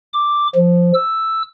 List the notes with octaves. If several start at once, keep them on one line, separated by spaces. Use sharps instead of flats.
D6
F3
E6